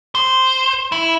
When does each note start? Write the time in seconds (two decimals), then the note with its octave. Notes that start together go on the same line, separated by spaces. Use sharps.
0.15 C5
0.92 E4